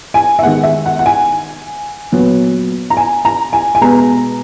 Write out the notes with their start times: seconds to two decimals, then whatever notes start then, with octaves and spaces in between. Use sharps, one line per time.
0.14 G#5
0.39 E5
0.42 D#3 G#3 B3 F#5
0.63 E5
0.86 F#5
0.99 F#5
1.06 G#5
2.12 A#2 F#3 B3
2.90 A#5
2.97 G#5
3.25 A#5
3.53 G#5
3.75 G#5
3.81 B2 G#3 B3 A#5